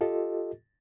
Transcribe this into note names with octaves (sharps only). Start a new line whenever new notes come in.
F4 G4 A4 D#5